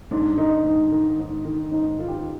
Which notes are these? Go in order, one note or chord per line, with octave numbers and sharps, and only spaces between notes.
G#2 D4
D#3 D#4
G#2
D#3
G#2
D#3
G#2 D#4
D#3 F4
G4
F4